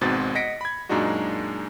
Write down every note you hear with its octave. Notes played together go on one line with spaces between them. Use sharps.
G#1 G#2 B2 C4 A6
D#5 F#5 A#6 B6 C#7 D7
B5 G#6
F#2 A#2 G#3 D4 D#4 F#4